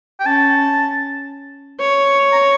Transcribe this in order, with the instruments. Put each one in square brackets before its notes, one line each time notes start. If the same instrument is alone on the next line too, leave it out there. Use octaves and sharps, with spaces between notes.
[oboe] G5
[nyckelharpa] C#4 [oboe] A5
[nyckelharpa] C#5
[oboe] A#5